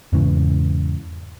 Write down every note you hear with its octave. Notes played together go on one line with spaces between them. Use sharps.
E2 G#2 C#3 E3